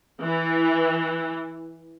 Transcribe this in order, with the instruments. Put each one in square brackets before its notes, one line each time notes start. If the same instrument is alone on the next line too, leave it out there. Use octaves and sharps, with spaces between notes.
[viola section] E3